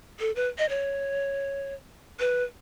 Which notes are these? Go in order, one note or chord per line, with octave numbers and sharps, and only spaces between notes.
A4
B4
D#5
C#5
B4